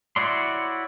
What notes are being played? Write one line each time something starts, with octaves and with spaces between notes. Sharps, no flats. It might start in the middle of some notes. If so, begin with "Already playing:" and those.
E4 F#4 C#5 D5 C6